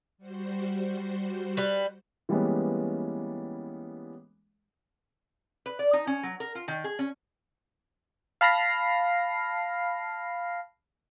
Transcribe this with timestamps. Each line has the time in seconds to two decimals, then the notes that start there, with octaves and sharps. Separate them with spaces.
0.18 G3 F#4 C5
1.57 G3 B4
2.29 E3 G3 G#3 A#3 B3 C#4
5.66 B4
5.79 D5
5.93 D#4
6.07 C#4
6.23 F#3
6.40 A#4
6.55 F4
6.68 D#3
6.84 G#4
6.99 C#4
8.41 F5 A5 B5 F6 A#6 C7